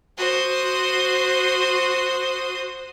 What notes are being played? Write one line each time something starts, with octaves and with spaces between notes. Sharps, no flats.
F#4 C5 D#6